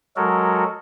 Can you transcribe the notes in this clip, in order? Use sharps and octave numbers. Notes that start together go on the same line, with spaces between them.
F#3 G#3 F#4 A4 A#4